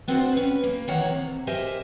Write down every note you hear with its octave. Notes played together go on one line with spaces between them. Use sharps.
B3 C4 D4 F4 F#4 C5
C#4 B4
A#3
D#3 E3 C#5 F#5 A#5
C3
G4 A#4 C5 D#5 E5 G#5